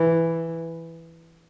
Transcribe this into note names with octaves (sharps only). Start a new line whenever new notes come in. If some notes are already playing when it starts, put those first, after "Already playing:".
Already playing: E3